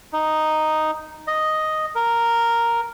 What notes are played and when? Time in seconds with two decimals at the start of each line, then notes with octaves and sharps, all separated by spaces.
0.13 D#4
1.28 D#5
1.95 A#4